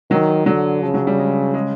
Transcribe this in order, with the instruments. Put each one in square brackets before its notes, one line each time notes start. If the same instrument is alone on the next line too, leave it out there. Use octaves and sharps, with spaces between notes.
[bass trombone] D#3 [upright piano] F#3
[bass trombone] D3 [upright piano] F#3
[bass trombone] C#3 [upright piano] F3
[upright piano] F#3
G3
G#3
G#3